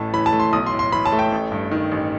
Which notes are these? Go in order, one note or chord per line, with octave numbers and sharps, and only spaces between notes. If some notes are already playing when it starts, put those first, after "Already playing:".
Already playing: A1 A2 A3 A5
E3 B5
A5
A3
C6
B1 D#6
C6
A2
C6
E3 B5
A5
A3
G5
A1
G2
D#3
A1